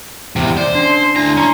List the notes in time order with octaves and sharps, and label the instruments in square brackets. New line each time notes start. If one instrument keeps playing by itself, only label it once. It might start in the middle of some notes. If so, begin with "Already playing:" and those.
[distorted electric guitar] E2 C3
[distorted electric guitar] C5 [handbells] D5
[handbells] C#4 D4 [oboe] C6
[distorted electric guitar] D2 A#5 [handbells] D4 E4 G#5
[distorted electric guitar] C#4 [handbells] A#5 C6